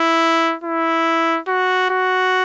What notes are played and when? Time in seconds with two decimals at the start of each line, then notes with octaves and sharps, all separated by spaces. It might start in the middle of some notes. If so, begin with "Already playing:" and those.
Already playing: E4
0.64 E4
1.48 F#4
1.90 F#4